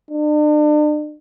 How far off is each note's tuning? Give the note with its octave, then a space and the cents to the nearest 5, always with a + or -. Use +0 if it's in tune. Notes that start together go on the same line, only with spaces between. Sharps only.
D4 +40